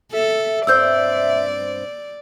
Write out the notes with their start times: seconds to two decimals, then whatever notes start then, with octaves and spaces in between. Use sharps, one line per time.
0.13 A4 E5
0.67 G2 C4 C5 D5 E6 G6